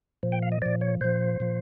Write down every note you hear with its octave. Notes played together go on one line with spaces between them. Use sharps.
A#2 F3
G5
F5
D#5
A#2 F3 D5
C#5
A#2 F3 C5
A#2 F3